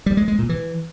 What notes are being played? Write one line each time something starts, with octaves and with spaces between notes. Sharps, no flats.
G3
G#3
G#3
A#2
E3